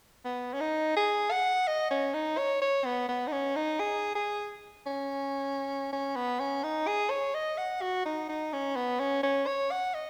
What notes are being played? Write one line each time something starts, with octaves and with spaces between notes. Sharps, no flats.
B3
C#4
D#4
G#4
F#5
D#5
C#4
D#4
C#5
C#5
B3
B3
D#4
C#4
D#4
G#4
G#4
C#4
C#4
B3
C#4
D#4
G#4
C#5
D#5
F#5
F#4
D#4
D#4
C#4
B3
C#4
C#4
C#5
F#5
D#5